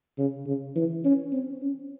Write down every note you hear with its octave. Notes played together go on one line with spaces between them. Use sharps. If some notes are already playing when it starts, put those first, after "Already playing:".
C#3
C#3
E3
C#4
C4
C#4